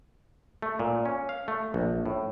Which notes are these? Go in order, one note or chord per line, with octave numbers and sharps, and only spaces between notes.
A3
A#2
C#4
F5
A3
A#1
A2